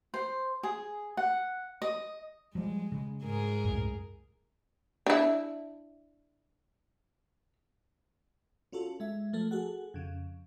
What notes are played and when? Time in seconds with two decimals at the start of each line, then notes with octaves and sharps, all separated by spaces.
0.14 C5
0.63 G#4
1.17 F#5
1.82 D#5
2.55 F3 G3 G#3
2.92 C#3
3.23 G#2 G#4 A#4
3.64 C2 F#2 A2
5.06 D4 E4
8.72 C#4 F4 F#4 A4
9.00 G#3 E5
9.33 F3 A3 A4
9.51 F#4 G#4 A4 F#5
9.94 F2 C#3